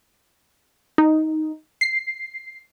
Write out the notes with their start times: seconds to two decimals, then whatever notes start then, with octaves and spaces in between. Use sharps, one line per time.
0.98 D#4
1.81 C7